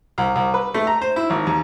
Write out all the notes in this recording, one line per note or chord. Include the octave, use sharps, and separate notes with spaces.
C2
C2
B4
A3
A#5
C5
E4
G#1
D#2